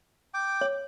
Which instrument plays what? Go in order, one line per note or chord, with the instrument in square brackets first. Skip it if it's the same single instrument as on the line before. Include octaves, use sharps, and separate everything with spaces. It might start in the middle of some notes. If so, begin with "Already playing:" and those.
[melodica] G5 D6
[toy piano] C#5